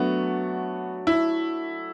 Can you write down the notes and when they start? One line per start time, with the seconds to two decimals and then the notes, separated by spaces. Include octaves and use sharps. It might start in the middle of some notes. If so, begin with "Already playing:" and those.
Already playing: F#3 A3 B3 D4 F#4
1.07 E4